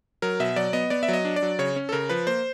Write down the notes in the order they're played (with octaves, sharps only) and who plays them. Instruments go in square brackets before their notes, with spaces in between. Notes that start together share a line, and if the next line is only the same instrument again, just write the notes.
[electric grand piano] F#3 A#4
B2 E5
F#3 D5
B3 D#5
B3 D5
E5
F#3 D#5
D4
D5
F#3
C#3 C#5
C#4
A4
C#3 A#4
F3 B4
A#3 C5